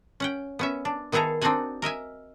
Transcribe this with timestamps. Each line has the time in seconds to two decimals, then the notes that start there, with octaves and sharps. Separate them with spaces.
0.20 C#4 F#5 G5
0.59 B3 C#4 E5
0.85 D4
1.12 D#3 B3 E4 G#4 A4 A#5
1.41 C4 D4 D#4 F#4 F#5 G#5
1.82 A#4 D#5 E5 G#5